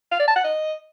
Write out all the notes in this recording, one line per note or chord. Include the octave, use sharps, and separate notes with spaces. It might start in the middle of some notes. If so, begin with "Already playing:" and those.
F5
D5
A5
F#5
D#5